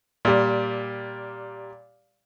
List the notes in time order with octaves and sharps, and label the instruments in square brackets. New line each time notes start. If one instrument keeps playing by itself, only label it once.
[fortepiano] A#2 G3